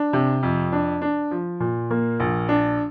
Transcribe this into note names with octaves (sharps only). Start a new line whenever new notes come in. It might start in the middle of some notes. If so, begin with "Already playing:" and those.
Already playing: D4
C3
F2
D4
D4
F3
A#2
A#3
A#1
D4